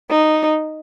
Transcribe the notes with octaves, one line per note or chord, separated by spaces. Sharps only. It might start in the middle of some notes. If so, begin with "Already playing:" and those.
D#4